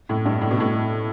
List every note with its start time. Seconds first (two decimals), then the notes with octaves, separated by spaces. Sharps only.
0.09 A2
0.26 G2
0.41 A2
0.51 B2
0.60 A2